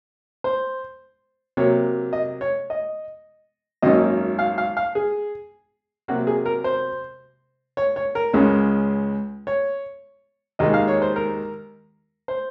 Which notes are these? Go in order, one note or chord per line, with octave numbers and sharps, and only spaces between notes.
C5
C3 F#3 A#3 C#5
D#5
C#5
D#5
G#1 F#2 D#3 A#3 C#4 D#5
F5
F5
F5
G#4
C3 F#3 A#3 F#4
G#4
A#4
C5
C#5
C#5
A#4
C#2 C#3 G#3 C#4
C#5
D#2 D#3 G#3 D#4 D#5
F5
C#5
C5
A#4
C5